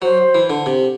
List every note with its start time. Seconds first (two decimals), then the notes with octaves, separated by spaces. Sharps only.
0.02 F#3 C5
0.35 E3
0.50 D3
0.66 C3